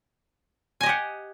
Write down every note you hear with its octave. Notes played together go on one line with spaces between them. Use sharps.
G4 D#5 F#5 G#5